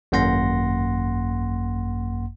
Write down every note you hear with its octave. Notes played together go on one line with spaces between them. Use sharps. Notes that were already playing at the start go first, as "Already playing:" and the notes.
G#1 F#2 A#3 F#5 C6 A#6